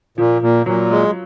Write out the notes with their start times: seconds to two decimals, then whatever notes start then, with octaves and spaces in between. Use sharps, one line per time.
0.18 A#2 F3
0.42 A#2
0.66 A#2 F#3
0.91 G#3